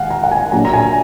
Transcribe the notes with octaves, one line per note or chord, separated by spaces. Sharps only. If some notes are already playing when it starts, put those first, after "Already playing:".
Already playing: D#3 G#3 F5 F#5 G#5
A#5
F#5
G#5
A#2 F#3 D4 A#5
A#5
G#5